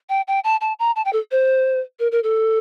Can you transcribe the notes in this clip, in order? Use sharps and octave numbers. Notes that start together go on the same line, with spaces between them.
G5
G5
A5
A5
A#5
A5
G5
A4
C5
A#4
A#4
A4